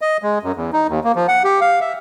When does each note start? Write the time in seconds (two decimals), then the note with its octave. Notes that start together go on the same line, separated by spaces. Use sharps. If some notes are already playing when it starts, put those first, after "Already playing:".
0.01 D#5
0.22 G#3
0.43 F#2
0.56 E2
0.73 D#4
0.89 D#2
1.04 A#3
1.15 F3
1.28 F#5
1.44 G4
1.61 F5
1.81 E5